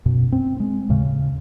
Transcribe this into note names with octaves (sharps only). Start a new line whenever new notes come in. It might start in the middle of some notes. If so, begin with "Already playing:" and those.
F#2 B2
C4
G#3
D#2 A2 C#3